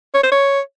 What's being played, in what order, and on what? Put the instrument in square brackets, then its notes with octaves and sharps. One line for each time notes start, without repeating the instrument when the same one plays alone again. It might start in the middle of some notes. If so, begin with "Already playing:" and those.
[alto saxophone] C#5
C5
C#5